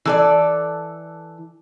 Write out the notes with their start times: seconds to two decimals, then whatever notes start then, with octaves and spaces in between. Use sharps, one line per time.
0.05 E3 A4 D5